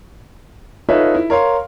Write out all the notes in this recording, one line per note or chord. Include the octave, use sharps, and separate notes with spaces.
D#4 F4 A4 B4 C#5 E5
E4
A#4 C#5 F5 C6